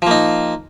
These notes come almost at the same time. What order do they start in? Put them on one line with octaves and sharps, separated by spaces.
F3 A#3 D#4